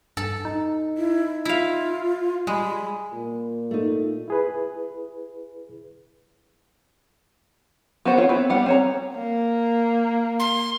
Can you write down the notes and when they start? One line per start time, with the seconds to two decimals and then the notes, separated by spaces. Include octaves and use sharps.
0.17 G2 A4
0.45 D#4
0.97 E4
1.45 E4 F4 F5
2.47 G3 G#3 B5
3.13 A#2
3.71 A3 D#4
4.28 E4 G#4 B4
8.05 B3 F#4 A#4 C5 F#5
8.17 C4 F4 C#5
8.29 B3 C4 E4
8.50 G3 B3 F#5
8.66 C4 C#5 A#5
9.15 A#3
10.40 C6